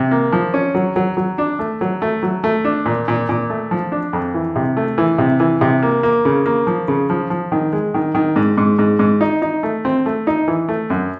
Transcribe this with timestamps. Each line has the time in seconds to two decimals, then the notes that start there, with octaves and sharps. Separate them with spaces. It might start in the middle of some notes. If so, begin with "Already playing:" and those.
Already playing: C3
0.11 A#3
0.32 F3
0.54 C#4
0.75 F#3
0.96 F#3
1.17 F#3
1.38 D4
1.59 A3
1.81 F#3
2.02 A3
2.23 F#3
2.44 A3
2.65 D4
2.86 A#2
3.08 A#2
3.29 A#2
3.50 A3
3.71 F3
3.92 D4
4.13 F2
4.34 E3
4.56 C3
4.77 A3
4.98 E3
5.18 C3
5.40 E3
5.61 C3
5.83 A#3
6.03 A#3
6.25 C#3
6.46 A#3
6.67 F3
6.88 C#3
7.10 F3
7.30 F3
7.52 D#3
7.73 G#3
7.94 D#3
8.15 D#3
8.36 G#2
8.57 G#2
8.79 G#2
8.99 G#2
9.21 D#4
9.42 D#4
9.63 A3
9.85 C4
10.06 A3
10.27 D#4
10.48 E3
10.69 A3
10.90 F#2